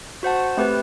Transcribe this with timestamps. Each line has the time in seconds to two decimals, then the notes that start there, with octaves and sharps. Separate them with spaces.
0.23 F#4 C5 F#5 A5
0.57 A3 C4 G4 B4